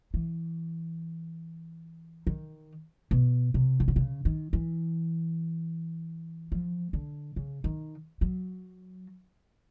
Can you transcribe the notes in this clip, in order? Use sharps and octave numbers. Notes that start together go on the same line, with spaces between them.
E3
D#3
B2
C3
D#3
D3
C#3
D#3
E3
F3
D3
C#3
D#3
F#3